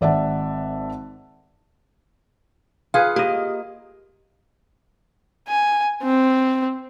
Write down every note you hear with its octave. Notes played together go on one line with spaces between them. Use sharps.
G#1 D5 E5 F#5 A5
F4 G#4 B4 F5
A#3 G4 D#5
G#5
C4